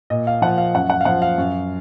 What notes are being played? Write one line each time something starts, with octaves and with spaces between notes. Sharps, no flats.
A#2 D#5
F5
F3 F#5
F5
F#2 F#5
F#5
F5
F3 F#5
F5
F#2